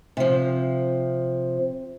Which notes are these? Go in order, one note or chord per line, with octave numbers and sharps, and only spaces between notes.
C3 F3